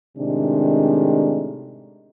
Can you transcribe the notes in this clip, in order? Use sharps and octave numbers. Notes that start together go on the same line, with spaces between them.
A2 C3 D#3 G#3 D4